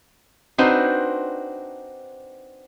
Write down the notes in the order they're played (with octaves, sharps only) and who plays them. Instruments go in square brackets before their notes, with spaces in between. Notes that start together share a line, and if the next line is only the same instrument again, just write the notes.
[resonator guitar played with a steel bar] C4 D4 D#4 F#4 B4 C5